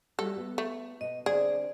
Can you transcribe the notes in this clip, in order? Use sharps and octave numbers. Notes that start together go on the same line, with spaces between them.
G3 A3 F#4 A4
B3
A3
B2 D#5
D3 C4 G#4 C5 D5